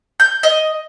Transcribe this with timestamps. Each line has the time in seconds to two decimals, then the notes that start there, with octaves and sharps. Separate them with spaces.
0.20 G6
0.43 D#5